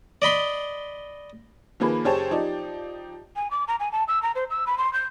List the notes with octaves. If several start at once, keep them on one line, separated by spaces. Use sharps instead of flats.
D5 D#5 B5 C6
D#3 F3 A#3 G#4 B4
F#1 G4 G#4 C5 C#5 A5
F3 D#4 G4 D5
G#5
D6
A#5
G#5
A5
E6
A#5
C5
E6
B5
C6
G6